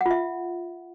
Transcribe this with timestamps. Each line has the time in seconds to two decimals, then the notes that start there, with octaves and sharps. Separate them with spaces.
0.01 F#5
0.06 F4
0.11 E5